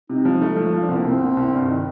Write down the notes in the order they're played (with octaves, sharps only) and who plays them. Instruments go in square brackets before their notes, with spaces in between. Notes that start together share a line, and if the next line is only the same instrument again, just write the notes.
[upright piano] C3 [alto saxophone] D#4
[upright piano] F3
[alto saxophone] D#4
[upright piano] A3
F3
F3
[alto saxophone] D4
[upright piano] C2 [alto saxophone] C4
[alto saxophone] A#3
[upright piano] C2 [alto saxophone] C4
[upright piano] C2
C2
G2
D#3